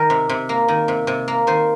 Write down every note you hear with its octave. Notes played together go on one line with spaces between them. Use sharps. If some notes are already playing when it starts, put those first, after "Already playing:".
Already playing: D#3 A#4
C3
C3
A#3
D#3
C3
C3
A#3
D#3 C5